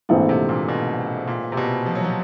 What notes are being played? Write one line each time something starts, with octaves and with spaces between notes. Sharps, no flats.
A#1 G#2 D3 E3 A3 C4
C3
A#2
B2
A#2
C3
B2
F3
F#3
F3